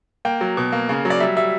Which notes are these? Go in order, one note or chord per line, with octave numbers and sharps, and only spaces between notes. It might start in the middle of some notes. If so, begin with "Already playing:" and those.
A#3 G5
F#3
B2
A#3
C#3
F#3
D5
G3 E5
G3 E5